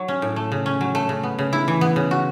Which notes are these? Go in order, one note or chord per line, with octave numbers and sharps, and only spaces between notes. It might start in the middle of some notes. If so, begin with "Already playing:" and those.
Already playing: F#3
C#4
A2
A3
C#3
C#4
F#3
A3
C#3
B3
C#3
E4
E3
B3
C#3
F#4